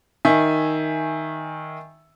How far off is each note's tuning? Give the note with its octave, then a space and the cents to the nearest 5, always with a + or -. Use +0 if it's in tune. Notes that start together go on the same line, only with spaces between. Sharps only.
D#3 +5 E5 +0 G#5 -5